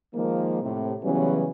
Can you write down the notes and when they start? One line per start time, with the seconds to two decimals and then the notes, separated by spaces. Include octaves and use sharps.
0.14 D#3 F3 G#3 A#3
0.63 A2 C3
1.03 C#3 E3 F#3 G3 B3 C#4